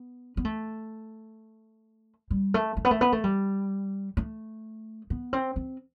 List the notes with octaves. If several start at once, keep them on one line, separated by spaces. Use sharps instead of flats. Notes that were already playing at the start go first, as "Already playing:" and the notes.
Already playing: B3
B3
A3
G3
A3
A3
B3
A3
B3
A3
G3
A3
B3
C4
C4